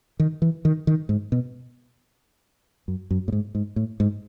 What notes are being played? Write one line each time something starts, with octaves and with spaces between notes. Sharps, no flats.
D#3
E3
D#3
D#3
G#2
B2
F#2
F#2
A2
G#2
G#2
A2
G#2